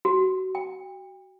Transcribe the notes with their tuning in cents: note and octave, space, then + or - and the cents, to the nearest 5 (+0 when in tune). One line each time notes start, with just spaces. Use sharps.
F#4 +25
G5 +35